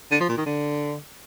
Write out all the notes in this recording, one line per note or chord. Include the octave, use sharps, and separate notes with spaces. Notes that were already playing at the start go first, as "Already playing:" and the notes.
D3
F3
A#2
D#3
D3